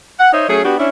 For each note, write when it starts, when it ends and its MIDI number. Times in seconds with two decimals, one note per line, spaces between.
0.19 0.30 78
0.32 0.47 63
0.32 0.47 72
0.32 0.47 73
0.32 0.47 75
0.32 0.47 76
0.48 0.62 54
0.48 0.62 57
0.48 0.62 61
0.48 0.62 68
0.64 0.75 59
0.64 0.75 62
0.64 0.75 66
0.64 0.75 67
0.77 0.89 61
0.77 0.89 62
0.77 0.89 64